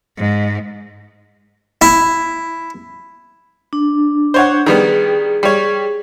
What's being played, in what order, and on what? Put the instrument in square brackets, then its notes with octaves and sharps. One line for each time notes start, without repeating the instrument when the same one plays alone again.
[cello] G#2
[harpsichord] E4
[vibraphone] D4
[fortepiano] C5 C#5 F#5
[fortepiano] D#3 G3 B3 [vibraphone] G#4
[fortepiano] G3 C#5